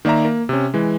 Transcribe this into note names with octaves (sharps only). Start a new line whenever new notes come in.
D#3 A#3 D5 E5 A#5
A#3
C3 C#4
E3 G#3